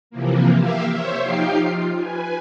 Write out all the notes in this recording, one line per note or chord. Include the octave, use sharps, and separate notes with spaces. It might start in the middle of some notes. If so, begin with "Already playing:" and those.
C3 E3 F3 A#3
A#3 G4 E5 F5
C5 C#5 E5
F3 D#4 G4 F5 G5 C7
F4
B4 G#5